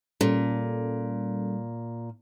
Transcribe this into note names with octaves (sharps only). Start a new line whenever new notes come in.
A#2 G3 C#4 A4